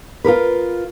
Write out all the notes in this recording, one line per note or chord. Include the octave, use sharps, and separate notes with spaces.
F4 G#4 A#4 B4